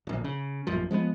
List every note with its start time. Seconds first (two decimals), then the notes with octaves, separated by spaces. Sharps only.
0.07 D1 A#1
0.24 C#3
0.67 D#1 A1 F#2 F3
0.91 F3 G#3 A#3 B3